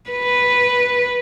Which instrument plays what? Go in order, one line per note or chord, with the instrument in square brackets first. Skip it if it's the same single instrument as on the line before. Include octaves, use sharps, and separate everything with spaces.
[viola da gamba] B4